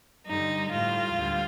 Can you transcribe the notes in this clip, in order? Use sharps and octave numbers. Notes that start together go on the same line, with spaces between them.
G2 D3 G3 D#4
A2 G3 F4
D2 D3 G3